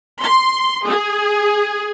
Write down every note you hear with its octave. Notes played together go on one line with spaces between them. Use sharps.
C6
G#4